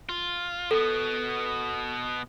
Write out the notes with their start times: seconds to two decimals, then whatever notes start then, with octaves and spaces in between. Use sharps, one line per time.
0.09 F4
0.71 B2 B3 A4